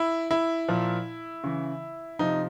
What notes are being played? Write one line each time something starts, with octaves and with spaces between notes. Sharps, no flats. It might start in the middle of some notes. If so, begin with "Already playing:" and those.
Already playing: E4
E4
A#2 F3
C#3 E3
C3 F3 D#4